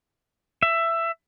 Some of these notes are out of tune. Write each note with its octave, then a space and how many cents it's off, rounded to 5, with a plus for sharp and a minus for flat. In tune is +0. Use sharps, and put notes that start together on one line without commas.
E5 +15